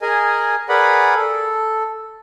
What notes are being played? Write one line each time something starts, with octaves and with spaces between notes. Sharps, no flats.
G#4 A#4 D#5 G#5
G#4 A#4 B4 D5 F#5 B5
A4